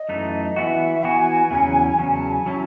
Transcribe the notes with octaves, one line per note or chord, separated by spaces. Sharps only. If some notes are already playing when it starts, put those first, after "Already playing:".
Already playing: D#5
F#2 E3 A3 D#4
E3 B3 F#4 E5
E3 B3 F#4 G#5
E2 C#3 F#3 C#4
E2 C#3 F#3 C#4 G#5
A5
G#5
F#3 C#4 E4 A5